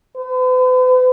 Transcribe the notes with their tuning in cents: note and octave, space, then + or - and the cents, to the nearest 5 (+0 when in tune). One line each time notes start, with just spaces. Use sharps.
B4 +45